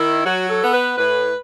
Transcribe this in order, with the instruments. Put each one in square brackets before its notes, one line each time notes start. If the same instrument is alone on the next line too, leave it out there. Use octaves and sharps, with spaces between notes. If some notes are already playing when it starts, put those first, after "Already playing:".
Already playing: [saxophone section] D#3 E4
F#3 F#4
A4
B3
B4
A2 B4